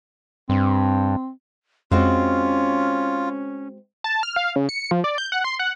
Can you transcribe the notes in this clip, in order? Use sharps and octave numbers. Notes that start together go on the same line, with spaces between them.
G2 C4
F2 G#3 C4 C#4 F4 F#4
A5
F6
F5
C#3
C#7
F3
D5
G6
F#5
C6
F#5